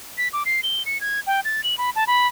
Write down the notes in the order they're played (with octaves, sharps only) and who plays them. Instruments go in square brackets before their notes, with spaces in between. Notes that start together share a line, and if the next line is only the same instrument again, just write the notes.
[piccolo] B6
D6
C7
G7
C#7
G#6
G5
A6
F#7
B5
A5
B5